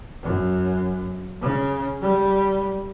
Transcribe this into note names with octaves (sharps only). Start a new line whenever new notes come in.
F#2
C#3
G3